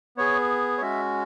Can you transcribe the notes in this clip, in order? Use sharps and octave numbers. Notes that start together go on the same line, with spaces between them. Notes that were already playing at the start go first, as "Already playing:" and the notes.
B3 G#4 C#5
C#5
G#3 C#4 F#4 E5